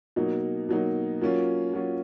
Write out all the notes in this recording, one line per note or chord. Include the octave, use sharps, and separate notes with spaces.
B2 F#3 A#3 D#4
B2 F#3 A#3 D#4
F#3 A#3 C#4 F4
F#3 A#3 C#4 F4